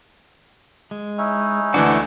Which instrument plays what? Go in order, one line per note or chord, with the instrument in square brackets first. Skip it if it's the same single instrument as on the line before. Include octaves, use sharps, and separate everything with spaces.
[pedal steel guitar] G#3
[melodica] C#4 D#4 E4
[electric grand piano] D2 E3 D4 [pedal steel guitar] F#5 A5 D6